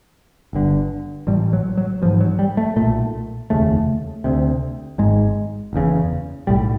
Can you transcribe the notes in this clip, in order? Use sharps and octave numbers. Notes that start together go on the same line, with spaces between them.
G1 G2 D3
A1 A2 G3
F#3
F#3
A1 G#2 F3
F#3
G3
A3
B1 A#2 A3
F1 D#2 C#3 A3
D2 C3
G#1 G#2 G#3
F#1 E2 C#3
B1 A2 G3